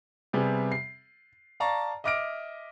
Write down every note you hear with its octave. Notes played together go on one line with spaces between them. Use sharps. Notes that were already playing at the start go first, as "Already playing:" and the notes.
C3 G3 B3 G#4
C7
D5 F5 A5 A#5 C#6
D#5 E5 D6 F6 A#6 D7